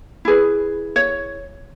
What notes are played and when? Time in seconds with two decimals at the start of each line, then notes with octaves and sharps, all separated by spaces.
0.25 E4 G#4 B4
0.96 C#5